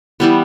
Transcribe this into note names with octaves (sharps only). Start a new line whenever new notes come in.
E3 G3 B3